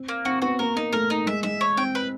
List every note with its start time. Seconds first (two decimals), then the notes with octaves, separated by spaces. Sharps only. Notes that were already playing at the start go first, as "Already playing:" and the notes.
Already playing: C4
0.08 A#3
0.25 C4 F#4
0.42 B3 F#4
0.59 A#3 A#4
0.76 A#3 D#4
0.93 A3 A#4
1.10 D#4
1.26 G#3 E5
1.43 G#3 E5
1.61 C#5
1.77 C4 G5
1.95 B4